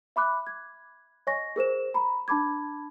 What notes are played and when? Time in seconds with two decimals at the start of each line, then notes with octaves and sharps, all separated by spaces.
0.16 E5 B5 D6 F#6
0.47 G#6
1.27 C#5 D#5 G#5 C#6 A#6
1.56 G#4 A#4 C5 E7
1.94 A#5 B5
2.28 D4 A5 B5 D6 G#6